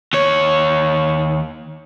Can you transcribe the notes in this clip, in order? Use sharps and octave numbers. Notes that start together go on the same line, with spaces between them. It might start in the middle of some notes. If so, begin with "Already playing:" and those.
D#2 C#5